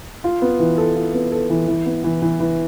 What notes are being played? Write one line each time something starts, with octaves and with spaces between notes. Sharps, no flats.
F4
B3
E3
A4
F4
B3
A4
E3
E3
B3
E3
E3
E3